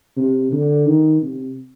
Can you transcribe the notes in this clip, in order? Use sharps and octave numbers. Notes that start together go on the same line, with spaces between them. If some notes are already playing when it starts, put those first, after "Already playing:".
C3
D3
D#3
C3